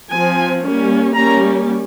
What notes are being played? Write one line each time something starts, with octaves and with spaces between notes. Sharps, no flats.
F3 C4 G#5
G3 A#3 C#4
G3 A#3 C#4 A#5